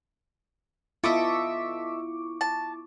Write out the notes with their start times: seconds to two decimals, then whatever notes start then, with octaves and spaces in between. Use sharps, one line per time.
1.04 B3 E4 F4 A4 D#5 E5 C#6 D6
2.41 A5